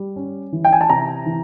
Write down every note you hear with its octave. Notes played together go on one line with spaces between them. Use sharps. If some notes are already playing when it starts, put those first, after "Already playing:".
Already playing: G3
C#4
E3
G5
G#5
A5
C3 A#5
E3